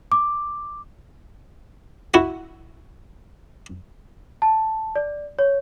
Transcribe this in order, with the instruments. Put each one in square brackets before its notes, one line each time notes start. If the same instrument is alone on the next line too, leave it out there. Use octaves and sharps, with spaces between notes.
[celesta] D6
[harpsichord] E4 F#4
[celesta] A5
D5
C#5